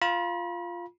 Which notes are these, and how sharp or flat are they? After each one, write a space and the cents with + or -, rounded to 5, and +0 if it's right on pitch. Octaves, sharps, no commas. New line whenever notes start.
F4 +0 B5 -40